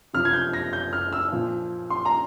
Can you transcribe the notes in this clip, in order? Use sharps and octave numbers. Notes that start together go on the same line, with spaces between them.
C3 F3 F6
G#6
G6
A#6
G6
F6
E6
A#2 F3
C6
A#5